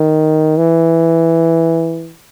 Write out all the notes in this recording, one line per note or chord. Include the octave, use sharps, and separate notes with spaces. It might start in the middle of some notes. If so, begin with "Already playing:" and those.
Already playing: D#3
E3